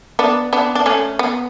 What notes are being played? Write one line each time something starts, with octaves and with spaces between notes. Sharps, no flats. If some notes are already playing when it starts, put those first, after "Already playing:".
B3 D4
B3 D4
D4
A3 C#4
B3